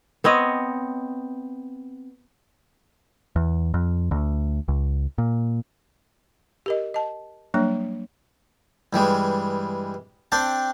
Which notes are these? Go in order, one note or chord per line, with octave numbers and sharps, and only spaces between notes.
B3 C4 C#5 D#5
E2
F2
D2
C#2
A#2
G4 A#4 D#5
D#5 A5
F#3 G3 A#3 D4 C#5
G2 E3 G3 G#3
C4 D4 D5 G5 A5